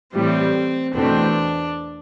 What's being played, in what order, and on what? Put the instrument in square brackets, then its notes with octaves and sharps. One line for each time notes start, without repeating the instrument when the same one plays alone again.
[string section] A2 E3 G3 [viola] C4
[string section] E2 B2 A3 C4 [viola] D4